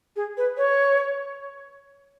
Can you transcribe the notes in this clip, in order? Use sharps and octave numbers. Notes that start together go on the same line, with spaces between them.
G#4
B4
C#5